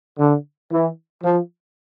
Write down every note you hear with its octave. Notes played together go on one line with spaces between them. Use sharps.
D3
E3
F3